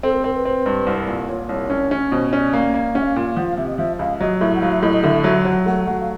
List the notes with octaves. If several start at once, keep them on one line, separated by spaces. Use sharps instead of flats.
C4 A4
A#4
A4
C4 A#4
B4
C4
G2
C2
A#2
A#2 C#5
C2 C#5
C#4
C#4
B2 C5
C#4 D5
A#3
A#3
C#4 F#5
E5
F5
A#2
F5
F3 F#5
F5
C3 E5
D#5
F3 E5
C#2 F5
F#3 D#5
A2 E5
F#5
F#3 F5
E5
A2 D#5
D#5
D3 E5
F#3 E5
F#3 F#5
A3 F#5
F#3 F#5
F5